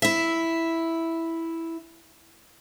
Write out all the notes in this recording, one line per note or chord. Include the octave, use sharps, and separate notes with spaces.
E4 E5